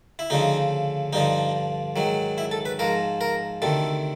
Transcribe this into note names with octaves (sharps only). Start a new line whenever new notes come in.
E4
D2 C#3 F3 D#4
G2 D3 F3 D#4
G#2 D#3 F#3
E4
A4
B4
G#2 F3 A#4
A#4
D2 C3 D#3 A4